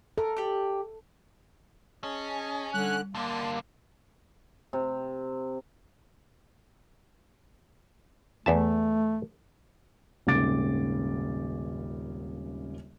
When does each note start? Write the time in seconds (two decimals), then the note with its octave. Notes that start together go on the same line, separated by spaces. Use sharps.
0.18 A4 A#4
0.37 G4 D5
2.04 C#4 G#4 D#5 A5
2.74 D3 G3 F#6
3.15 G2 D3 A#3 A5 C6
4.73 C3
8.46 E2 A3 E5 A5
10.27 D#1 G#1 C#3 D6 A6 D7